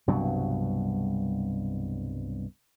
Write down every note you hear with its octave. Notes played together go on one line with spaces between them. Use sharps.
C2 G2 B2 F#3